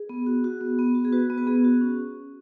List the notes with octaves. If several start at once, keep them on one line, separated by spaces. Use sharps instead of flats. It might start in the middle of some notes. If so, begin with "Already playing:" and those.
Already playing: G#4
B3
F#4
F#4
B3
B3
F#4
G#4
F#4 B4
B3
B4
B3 G#4
F#4
C#4